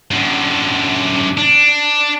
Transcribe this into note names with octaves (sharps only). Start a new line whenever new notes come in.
F#2 D3
D4